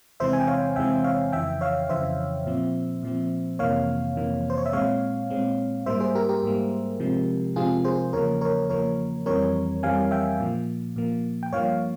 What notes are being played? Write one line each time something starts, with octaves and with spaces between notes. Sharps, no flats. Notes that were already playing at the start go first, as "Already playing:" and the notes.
E2 C3 E3 G#3 C4 C5 E5
G#5
G5
C#5 F5
E2 C3 E3 G#3 C4 E5 G5
C#5 F5
F2 C#3 E3 E5 G5
C#5 F5
F2 C#3 E3 C5 E5
A#2 F3 C4
A#2 F3 C4
F2 C3 E3 A#3 C#5 F5
F2 C3 E3 A#3
C5
C#5
E5
A#2 G#3 C4 C#5 F5
A#2 G#3 C4
G#2 G3 A#3 C5 E5
G#4 C5
G4 A#4
G4 A#4
G#2 G3 A#3
C3 F3 G#3 C4
C3 F3 G#3 C4 F4 G#4
G#4 C5
E2 C#3 F3 A#3 A#4 C#5
A#4 C#5
E2 C#3 F3 A#3 A#4 C#5
F2 E3 G3 C4 A#4 C#5
F2 E3 G3 C4 F5 G#5
E5 G5
A#2 F3 A#3
A#2 F3 A#3
G5
G2 F3 A#3 C#5 F5